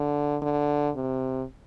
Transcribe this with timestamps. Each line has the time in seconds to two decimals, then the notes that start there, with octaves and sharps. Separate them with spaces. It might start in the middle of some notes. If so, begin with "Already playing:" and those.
Already playing: D3
0.43 D3
0.96 C3